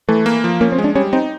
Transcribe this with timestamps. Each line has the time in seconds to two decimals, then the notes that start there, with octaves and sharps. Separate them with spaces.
0.09 E3 A3
0.26 A#3
0.44 F3
0.61 A#3 C#4
0.72 C4
0.78 G#3
0.84 D4
0.95 G3 C#4
1.13 C4 D#4